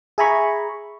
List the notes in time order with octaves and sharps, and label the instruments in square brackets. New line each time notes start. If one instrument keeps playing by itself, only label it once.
[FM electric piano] G#4 E5 G#5 A#5 B5 C#6